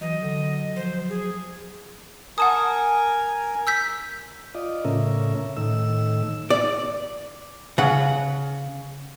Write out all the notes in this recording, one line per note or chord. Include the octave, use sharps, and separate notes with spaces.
E3 F#3 D#5
D3
F3 C5
G#4
A#4 F#5 G#5 A5 D#6
E6 G6 B6
F4 D5 D#5
A2 C#3 C#4 A#4 E5
A2 D#3 E6
D5
C#3 F#5